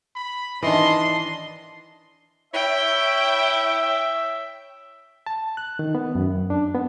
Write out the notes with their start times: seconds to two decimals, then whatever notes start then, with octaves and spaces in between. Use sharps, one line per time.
0.15 B5
0.62 D#3 E3 D4 D#5 C6
2.54 E4 C#5 E5 G5
5.27 A5
5.57 F#6
5.79 D#3
5.95 B3
6.15 F#2
6.50 D4
6.74 B3